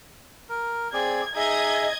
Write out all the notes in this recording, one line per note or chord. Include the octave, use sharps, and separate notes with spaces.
A#4
C4 G#4 D5 G#6
D#4 G#4 D#5 E5 G#6